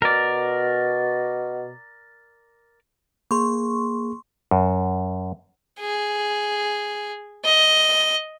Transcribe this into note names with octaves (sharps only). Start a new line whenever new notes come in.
B2 A#4 D5
A#3 G#4 C6 C#6
F#2
G#4
D#5